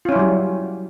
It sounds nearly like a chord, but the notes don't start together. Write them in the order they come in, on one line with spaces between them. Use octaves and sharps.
F4 C#4 E4 F#3 G3